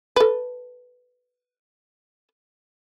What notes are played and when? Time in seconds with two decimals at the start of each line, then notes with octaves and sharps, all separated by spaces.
0.16 A4 B4